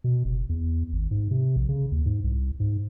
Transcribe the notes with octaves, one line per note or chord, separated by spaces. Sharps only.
B2
F#1
E2
G#1
G#2
C3
A#1
C#3
D#2
G#2
C2
G#2